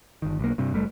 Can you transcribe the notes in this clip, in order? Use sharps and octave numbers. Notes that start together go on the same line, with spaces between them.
G1 D#3
B1 A#3
G2 C3
F#1 G3 A3